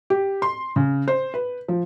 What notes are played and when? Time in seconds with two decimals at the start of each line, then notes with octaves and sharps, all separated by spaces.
0.10 G4
0.42 C6
0.76 C#3
1.08 C5
1.34 B4
1.68 F3